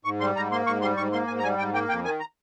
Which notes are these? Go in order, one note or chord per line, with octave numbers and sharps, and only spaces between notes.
G#2 C#6
G3 C6
G#2 A#5
A#3 C6
G#2 C#6
G3 C6
G#2 C#6
A#3 C6
G#2 G#5
A#5
G3 G#5
G#2 G5
A#3 G5
F2 G5
D#3 G#5
A#5